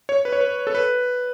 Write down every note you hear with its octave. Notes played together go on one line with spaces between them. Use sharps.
C#5
B4
C#5
B4
A4
B4